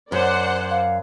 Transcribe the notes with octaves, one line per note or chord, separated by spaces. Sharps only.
F#2 C5 D5 F#5
F5